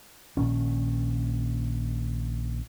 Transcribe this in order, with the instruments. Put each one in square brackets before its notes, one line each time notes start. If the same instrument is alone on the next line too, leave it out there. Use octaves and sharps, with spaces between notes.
[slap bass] A#1 A#2 D#3 C#4